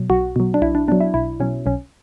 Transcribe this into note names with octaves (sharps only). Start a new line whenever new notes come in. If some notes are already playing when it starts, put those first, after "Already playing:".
Already playing: B2 F#3
B1 F#4
B2 F#3
D4
B1 E4
D4
B2 F#3 D4
E4
B1 E4
B2 F#3 C#4
B1 C#4